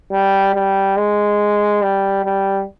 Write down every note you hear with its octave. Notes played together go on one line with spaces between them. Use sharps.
G3
G3
G#3
G3
G3